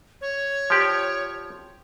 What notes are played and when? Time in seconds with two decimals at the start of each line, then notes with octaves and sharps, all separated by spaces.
0.21 C#5
0.70 F3 G4 D5